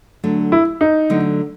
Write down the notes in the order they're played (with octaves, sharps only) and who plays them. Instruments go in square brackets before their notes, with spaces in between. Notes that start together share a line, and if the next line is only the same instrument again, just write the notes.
[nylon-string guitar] D3 F#3 A3
[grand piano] E4
D#4
[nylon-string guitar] D3 F#3 A3